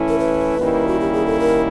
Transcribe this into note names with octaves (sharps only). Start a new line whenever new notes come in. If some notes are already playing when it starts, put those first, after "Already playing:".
Already playing: E3 A3 C#4 E4
A#4
B4
D#3 G3 A#3 C#4 E4
F#4
G4
G#4
A4
A#4